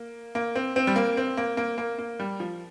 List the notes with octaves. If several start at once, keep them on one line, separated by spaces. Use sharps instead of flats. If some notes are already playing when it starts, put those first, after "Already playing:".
Already playing: A#3
A#3
C4
C4
G3
A#3
C4
A#3
A#3
A#3
A#3
G3
F3